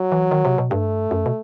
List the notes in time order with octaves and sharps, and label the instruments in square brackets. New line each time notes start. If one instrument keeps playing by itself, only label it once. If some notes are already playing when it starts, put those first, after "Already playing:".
Already playing: [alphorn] F#3
[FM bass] E3
D#3
C3
B2
[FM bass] G2 [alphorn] A3
[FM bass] F#2
B2